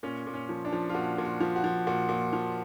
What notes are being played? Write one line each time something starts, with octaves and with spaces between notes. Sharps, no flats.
A#2 C#4
A#2
C#4
F3
D4
F3
F4
A#2 F#4
A#2
F#4
F3
F#4
F3
A#2 F#4
A#2
F3